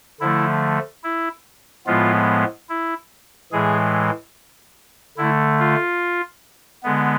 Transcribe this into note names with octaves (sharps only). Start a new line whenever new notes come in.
D3 F3 A3 E4
E4
A2 F3 G#3 B3 F4
E4
A2 E3 G#3 G#4
D3 A3 E4
F4
D3 G#3 B3